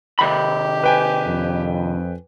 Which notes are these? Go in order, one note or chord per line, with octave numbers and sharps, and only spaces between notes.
C3 D#3 G4 B5
B4 G5 G#5
F2